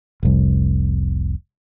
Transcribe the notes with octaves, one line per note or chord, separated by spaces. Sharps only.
F1 C2